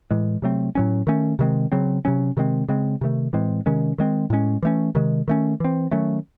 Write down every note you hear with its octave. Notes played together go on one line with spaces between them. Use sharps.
A2 E3 G#3
C3 F#3 A3 C4
A2 F#3 C#4
D#3 A3 C#4
C3 D#3 G#3 C4
C#3 F#3 C4
C3 F#3 C#4
C3 D#3 G#3 C4
C#3 G#3 C4
C3 D#3 A3
A2 E3 G#3 C4
C3 D#3 G#3 C#4
D#3 G#3 C4
A2 G#3 C#4
E3 A3 C#4
C3 D#3 G#3
D#3 A3 C#4
E3 C4
D#3 F#3 A3 C#4